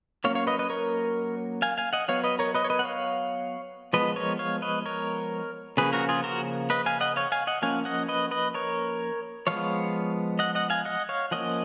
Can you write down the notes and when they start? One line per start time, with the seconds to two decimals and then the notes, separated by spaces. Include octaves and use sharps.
0.24 F#3 A#3 C#4 C#5 F5
0.35 C#5 F5
0.47 B4 D#5
0.59 B4 D#5
0.70 A#4 C#5
1.62 F5 G#5
1.78 F5 G#5
1.93 D#5 F#5
2.08 F#3 B3 C#5 F5
2.24 B4 D#5
2.39 A#4 C#5
2.55 B4 D#5
2.64 C#5
2.70 B4 D#5
2.79 F#5
2.85 C#5 F5
3.93 F3 G#3 B3 B4 D#5
4.16 A#4 C#5
4.39 C#5 F5
4.62 B4 D#5
4.86 A#4 C#5
5.77 C#3 F3 A#3 C#4 G#4 B4
5.93 F#4 A#4
6.09 F4 G#4
6.24 F#4 A#4
6.70 B4 D#5
6.86 F5 G#5
7.01 D#5 F#5
7.16 C#5 F5
7.32 F5 G#5
7.47 D#5 F#5
7.62 F3 A#3 C#4 F5 G#5
7.85 D#5 F#5
8.08 B4 D#5
8.31 B4 D#5
8.54 A#4 C#5
9.47 F3 G#3 B3 C#5 F5
10.39 D#5 F#5
10.55 D#5 F#5
10.70 F5 G#5
10.85 D#5 F#5
11.09 C#5 F5
11.31 F3 A#3 C#4 D#5 F#5